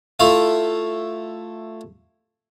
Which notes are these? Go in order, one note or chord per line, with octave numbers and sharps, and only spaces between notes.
A3 E4 F4 F5